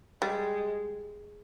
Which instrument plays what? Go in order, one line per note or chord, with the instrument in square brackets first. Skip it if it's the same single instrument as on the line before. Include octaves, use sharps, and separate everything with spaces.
[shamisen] G3 [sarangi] G#3